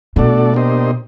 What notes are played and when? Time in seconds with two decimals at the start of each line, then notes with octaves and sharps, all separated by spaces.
0.16 B2 A3 D4 F#4 A4 D5
0.54 A#3 D4 G4 C5 D#5